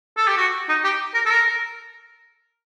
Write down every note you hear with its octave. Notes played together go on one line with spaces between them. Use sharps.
A4
G4
F#4
D#4
G4
A#4
A4
A#4